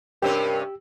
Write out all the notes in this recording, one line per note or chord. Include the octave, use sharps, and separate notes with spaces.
G2 C3 C#4 G4 A#4 E6